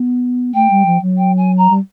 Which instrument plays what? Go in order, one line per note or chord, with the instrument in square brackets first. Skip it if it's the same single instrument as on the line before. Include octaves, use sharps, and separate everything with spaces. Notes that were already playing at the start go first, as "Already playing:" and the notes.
Already playing: [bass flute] B3
[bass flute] A3 [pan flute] G5
[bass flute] G3
F3
F#3
[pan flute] G5
G#5
A#5
[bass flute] G3